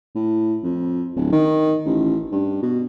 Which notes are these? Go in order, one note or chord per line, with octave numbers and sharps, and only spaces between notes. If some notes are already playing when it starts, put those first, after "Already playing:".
A2
F2
D1
D#3
A1
G2
B2